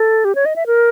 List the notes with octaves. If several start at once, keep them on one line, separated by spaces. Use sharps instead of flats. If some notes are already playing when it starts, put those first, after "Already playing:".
Already playing: A4
G4
C#5
D#5
E5
A#4